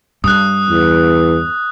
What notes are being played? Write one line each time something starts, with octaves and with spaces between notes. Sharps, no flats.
G2 D#6 F#6
E2